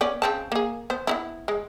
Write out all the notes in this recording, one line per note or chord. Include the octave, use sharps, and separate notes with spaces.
B3 C#4 D5
C#3 C4 A5
A#3 G#4
B3 C5
B3 D#4 E4
G#3